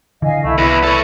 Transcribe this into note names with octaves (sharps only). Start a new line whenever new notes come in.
D3 E3 D#5 F5 G#5
C2 A3 E4
E2 E4 B4
A4 C#5